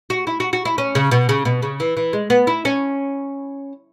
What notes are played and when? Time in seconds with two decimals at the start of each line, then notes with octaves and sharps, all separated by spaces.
0.10 F#4
0.27 E4
0.40 F#4
0.53 F#4
0.65 E4
0.78 C#4
0.95 C#3
1.11 B2
1.29 C#3
1.45 B2
1.62 C#3
1.80 E3
1.97 E3
2.13 G#3
2.30 B3
2.47 E4
2.65 C#4